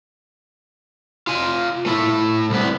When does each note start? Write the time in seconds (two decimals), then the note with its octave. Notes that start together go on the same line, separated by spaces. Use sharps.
1.27 F4 G#5
1.86 A3 E4
2.50 C2 B3